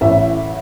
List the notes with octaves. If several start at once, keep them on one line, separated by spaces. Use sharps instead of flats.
A1 A2 E3 E5